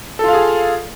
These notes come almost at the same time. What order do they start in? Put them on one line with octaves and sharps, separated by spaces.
A4 F4 F5 G#4